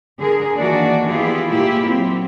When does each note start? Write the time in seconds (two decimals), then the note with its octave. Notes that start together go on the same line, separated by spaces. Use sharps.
0.19 D3 G#4 A#4
0.56 D#3 E3 A#3 D4 F#4 D5
1.07 B3 E4 F4 G4 G#4
1.50 A#2 A#3 E4 G4
1.87 F#3 C4